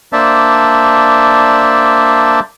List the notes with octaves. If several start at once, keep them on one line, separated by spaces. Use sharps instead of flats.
A#3 D4 C5 D5 E5 A5